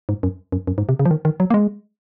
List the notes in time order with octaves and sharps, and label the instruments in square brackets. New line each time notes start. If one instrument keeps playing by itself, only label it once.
[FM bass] G#2
F#2
F#2
F#2
G#2
C3
C#3
F3
D#3
D#3
F#3
A#3
G#3